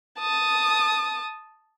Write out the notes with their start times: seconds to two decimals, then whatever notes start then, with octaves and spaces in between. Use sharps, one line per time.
0.19 A5 D#6